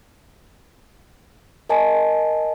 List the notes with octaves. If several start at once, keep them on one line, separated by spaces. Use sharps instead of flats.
A#4 D#5 G#5 A5